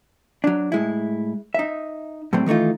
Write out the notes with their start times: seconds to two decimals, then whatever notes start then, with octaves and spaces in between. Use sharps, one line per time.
0.44 F#3 D4
0.72 A2 G#3 E4
1.54 D#4 E5
2.33 A2 F#3 G3 C4
2.46 D#3 E3 A3 D#4 F4